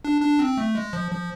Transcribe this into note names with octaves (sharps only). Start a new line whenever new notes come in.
D4
D4
C4
A3
G#3
F3
F3